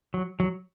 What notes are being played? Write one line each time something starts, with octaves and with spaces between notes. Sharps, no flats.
F#3
F#3